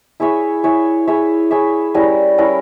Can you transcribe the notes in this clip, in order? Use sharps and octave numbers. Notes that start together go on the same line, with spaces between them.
E4 G#4 C#5 E5
E4 G#4 C#5 E5
E4 G#4 C#5 E5
E4 G#4 C#5 E5
G3 C#4 E4 A#4
G3 C#4 E4 A#4